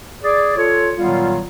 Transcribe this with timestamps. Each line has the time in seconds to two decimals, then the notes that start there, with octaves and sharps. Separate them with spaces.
0.23 G#4 D5
0.57 F4 A4 C#5
0.98 A#2 D#3 F#3 G3 B3 F4